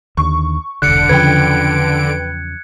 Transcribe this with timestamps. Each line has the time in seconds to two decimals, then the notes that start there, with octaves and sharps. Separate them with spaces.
0.17 D#2 D3 C#6
0.82 E1 C2 D3 F#6 C#7 D7
1.09 E2 C#3 F3 B4 G5 G#6